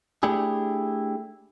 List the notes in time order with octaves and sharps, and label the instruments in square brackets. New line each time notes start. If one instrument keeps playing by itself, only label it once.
[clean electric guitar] A3 D4 E4 G4 G#4